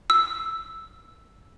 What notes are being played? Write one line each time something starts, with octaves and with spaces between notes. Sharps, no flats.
E6